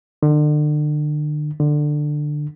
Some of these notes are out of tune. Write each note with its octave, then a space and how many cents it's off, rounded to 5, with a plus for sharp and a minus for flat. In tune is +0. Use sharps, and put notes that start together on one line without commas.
D3 +35
D3 +15